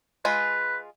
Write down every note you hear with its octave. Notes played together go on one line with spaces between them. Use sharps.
G#3 F4 G#4 B4